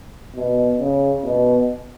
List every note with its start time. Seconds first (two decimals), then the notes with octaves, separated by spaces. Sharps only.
0.35 B2
0.80 C#3
1.24 B2